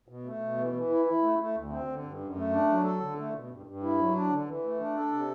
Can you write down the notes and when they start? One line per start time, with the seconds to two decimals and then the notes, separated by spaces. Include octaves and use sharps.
0.08 B2
0.25 A3
0.41 B2
0.57 E3
0.73 E3
0.90 E4
1.05 E4
1.22 A3
1.39 A3
1.55 D2
1.70 C4
1.88 D3
2.03 G2
2.20 F#2
2.36 A3
2.52 D4
2.69 F#3
2.85 A4
3.00 D3
3.17 A3
3.34 B2
3.50 G2
3.66 G2
3.83 E4
3.98 F#3
4.15 D4
4.30 D3
4.47 E3
4.64 A3
4.80 D4
4.96 A4
5.12 C3